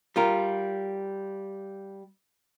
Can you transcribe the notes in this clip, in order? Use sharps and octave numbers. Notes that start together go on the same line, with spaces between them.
G3 F4 A#4